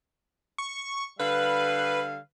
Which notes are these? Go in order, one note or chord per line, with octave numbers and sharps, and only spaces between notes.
C#6
D3 G3 B4 F5